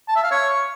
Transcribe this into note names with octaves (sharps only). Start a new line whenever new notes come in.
A5
E5
F5
C#5